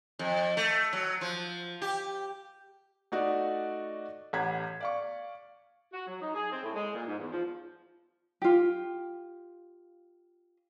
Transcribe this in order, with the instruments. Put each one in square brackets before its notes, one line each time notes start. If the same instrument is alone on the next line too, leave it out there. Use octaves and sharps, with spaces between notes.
[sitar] F2
A3
F#3
F3
G4
[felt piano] A3 D#4 F#4 D5
A1 G4 F#5 A#5 G#6 B6
D5 F5 C#6
[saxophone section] F#4
F#3
D#4
G#4
C4
A2
G#3
A#2
G#2
E2
F3
[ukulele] F4 G4